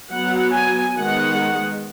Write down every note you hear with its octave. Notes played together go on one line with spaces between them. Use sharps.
F#3 B3 F#5
G#5
D#3 G#3 B3 F#5